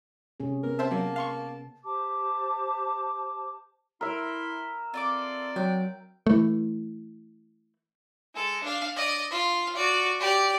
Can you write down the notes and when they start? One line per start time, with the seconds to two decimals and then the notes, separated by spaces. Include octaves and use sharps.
0.40 C3 C#4 G#4
0.63 B3 A#4
0.79 C4 C5 E5 A5
0.91 F#3 A#3
1.16 F5 C6 C#6
1.85 G4 C5 A5 D6
4.01 E4 A#4 E5 B5 C6
4.94 C4 F4 A4 D5 D6
5.56 F#3 G5
6.27 E3 A3
8.35 G#3 A4
8.64 D4 F5
8.96 D5 D#5
9.31 F4 F5
9.76 F#4 D5
10.20 G4 D5